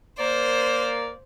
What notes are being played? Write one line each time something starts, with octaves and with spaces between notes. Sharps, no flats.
A#3 C5 D5